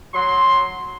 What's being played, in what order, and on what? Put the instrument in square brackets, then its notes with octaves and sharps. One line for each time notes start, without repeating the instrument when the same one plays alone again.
[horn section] F#3 C6